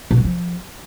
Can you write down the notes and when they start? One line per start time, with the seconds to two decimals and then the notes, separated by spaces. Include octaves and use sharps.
0.11 B2
0.18 F#3
0.24 F3